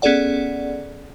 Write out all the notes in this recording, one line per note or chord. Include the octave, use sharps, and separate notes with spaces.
B3 C#4 G#4 A4 D5 F#5